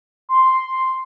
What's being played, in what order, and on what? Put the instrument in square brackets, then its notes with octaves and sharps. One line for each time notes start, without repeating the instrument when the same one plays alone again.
[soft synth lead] C6